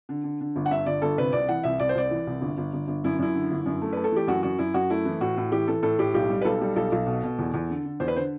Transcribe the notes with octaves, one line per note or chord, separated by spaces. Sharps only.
D3
D3
D3
G1
F#5
G2 E5
G1 D5
G1 A4
C3 B4
C2 D5
E3 F#5
C2 E5
C2 D5
C5
C2 D5
E3
C2
G1
G1
G1
G1
F#2 E4
F#2 E4
D3
G1
F#2
A3
A3 B4
A4
E3 G4
F#2 F#4
F#2 F#4
F#2 E4
F#2 F#4
A3 E4
E3
A2 F#4
A2
E3 G4
E3 A4
A2 A4
A2 G4
B1 G4
G3
B4
B1 A4
G3
B1 A4
B1
B2
B2
E2
E2
D3
D3
E2 C5
B4
D3 C5